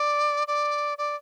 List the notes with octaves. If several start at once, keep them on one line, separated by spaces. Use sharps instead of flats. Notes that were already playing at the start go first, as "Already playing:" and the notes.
Already playing: D5
D5
D5